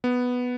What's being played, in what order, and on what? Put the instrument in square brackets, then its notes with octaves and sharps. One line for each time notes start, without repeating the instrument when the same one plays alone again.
[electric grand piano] B3